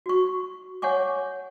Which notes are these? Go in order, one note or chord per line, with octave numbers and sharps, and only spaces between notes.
F#4 C#6
C#5 F#5 G#5 C#6 D6